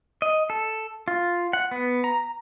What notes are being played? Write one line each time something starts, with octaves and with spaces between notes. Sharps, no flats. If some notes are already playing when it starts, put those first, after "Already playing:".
D#5
A4
F4
F#5
B3
A#5